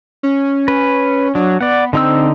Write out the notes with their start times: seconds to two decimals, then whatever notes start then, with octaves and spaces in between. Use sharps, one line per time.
0.23 C#4
0.68 B4
1.35 F#3 D4
1.61 B3 D5 F#5
1.93 D3 C4 D#4 E6